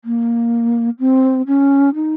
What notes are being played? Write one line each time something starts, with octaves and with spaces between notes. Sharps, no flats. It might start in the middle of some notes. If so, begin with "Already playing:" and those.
A#3
C4
C#4
D#4